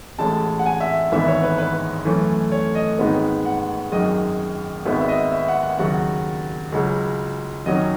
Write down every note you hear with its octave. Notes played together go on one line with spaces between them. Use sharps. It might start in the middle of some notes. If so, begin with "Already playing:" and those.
A1 A2 G#3 C#4 A5
F#5
G#5
E5
G#1 G#2 E3 B3 E5
C#5
B4
B4
F#2 E3 A3 C#4
C#5
D#5
G#1 G#2 D#3 G#3 B3
F#5
G#1 F#2 D#3 G#3 D#5
G#1 G#2 D#3 G#3 B3 E5
E5
D#5
E5
F#5
F#5
D#2 C#3 F#3 F#5
C#2 C#3 F#3
F#2 D#3 F#3 C#4 D#5